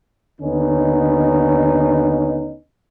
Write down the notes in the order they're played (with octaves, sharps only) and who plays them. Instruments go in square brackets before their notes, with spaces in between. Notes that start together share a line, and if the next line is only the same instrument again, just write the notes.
[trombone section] D#2 D3 B3 C#4 D#4